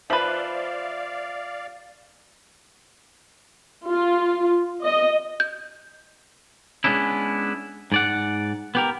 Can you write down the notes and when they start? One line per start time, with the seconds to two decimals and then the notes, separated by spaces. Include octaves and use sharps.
0.10 F3 B4 C5 D5 E5 F5
3.88 F4
4.83 D#5
5.40 G6
6.84 G#3 B3 C#4 D4 E4
7.92 G#2 D5 F#5
8.75 B3 G4 A#4